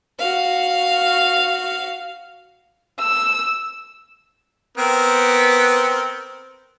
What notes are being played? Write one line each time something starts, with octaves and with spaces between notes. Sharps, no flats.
F#4 F5
E6
B3 C4 A#4